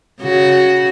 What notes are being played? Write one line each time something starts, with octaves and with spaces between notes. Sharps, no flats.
C#3 F#4